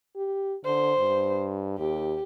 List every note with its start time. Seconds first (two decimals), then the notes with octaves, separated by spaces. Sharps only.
0.16 G4
0.65 D3 C5
0.99 G2
1.79 D#2 G4